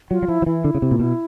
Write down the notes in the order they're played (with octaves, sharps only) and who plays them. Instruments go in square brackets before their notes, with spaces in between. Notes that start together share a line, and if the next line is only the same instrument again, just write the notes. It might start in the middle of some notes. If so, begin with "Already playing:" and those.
[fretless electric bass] F#3 [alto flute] F4
[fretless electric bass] F#3
[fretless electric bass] F3 [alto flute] E4
[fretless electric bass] F3
[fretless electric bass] E3 [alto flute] E4
[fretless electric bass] D3
C#3
C3
A#2
[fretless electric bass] B2 [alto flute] E4